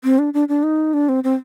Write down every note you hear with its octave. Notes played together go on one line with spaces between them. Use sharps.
C4
D4
D4
D4
D#4
D4
C4
C4